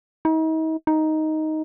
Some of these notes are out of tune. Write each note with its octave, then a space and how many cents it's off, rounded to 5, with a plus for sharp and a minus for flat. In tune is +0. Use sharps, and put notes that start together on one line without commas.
D#4 +40
D#4 +5